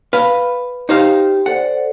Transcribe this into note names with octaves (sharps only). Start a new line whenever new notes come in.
B4 F5
D#4 G4 C5 F5 G5
A4 C5 D5 F#5